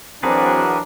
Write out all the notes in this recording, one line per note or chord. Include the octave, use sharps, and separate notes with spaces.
E3 F#3 C4 D4 F#4 G#4 A#4 B4